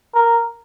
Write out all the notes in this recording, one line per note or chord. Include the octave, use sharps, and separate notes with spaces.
A#4